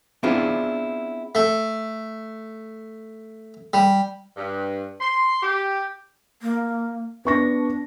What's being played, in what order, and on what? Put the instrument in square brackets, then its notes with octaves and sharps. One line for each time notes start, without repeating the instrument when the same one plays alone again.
[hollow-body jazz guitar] B3 C4 D4 E4 F4 G#4
[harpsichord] A3
G3
[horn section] G2
C6
G4
[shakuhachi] A#3
[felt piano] B3 C#6 A#6 [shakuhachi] D4